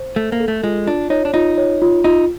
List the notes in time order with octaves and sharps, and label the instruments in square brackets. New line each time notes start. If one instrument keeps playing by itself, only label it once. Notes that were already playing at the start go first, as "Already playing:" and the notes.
Already playing: [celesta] C5
[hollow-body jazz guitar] A3 [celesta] A4
[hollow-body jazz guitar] A#3
[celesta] A4
[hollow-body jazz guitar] A3
[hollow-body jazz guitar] G#3 [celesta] F4
[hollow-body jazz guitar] D4 [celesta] F4
[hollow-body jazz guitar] D#4 [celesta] C#5
[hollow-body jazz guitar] D4
[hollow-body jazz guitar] D#4 [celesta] F4
[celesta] C#5
F4
[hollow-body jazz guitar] D#4 [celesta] F4